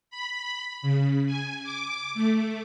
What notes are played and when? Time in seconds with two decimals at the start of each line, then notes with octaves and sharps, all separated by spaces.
0.10 B5
0.82 C#3
1.26 G#5
1.64 D6
2.14 A3